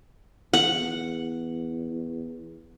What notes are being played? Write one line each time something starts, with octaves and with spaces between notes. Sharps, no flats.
E2 F#5